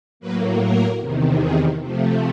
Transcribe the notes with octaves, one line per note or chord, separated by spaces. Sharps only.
A2 F#3 A#3 B4
A#4
E2 C3 D#3
G#4
C3 F3 A3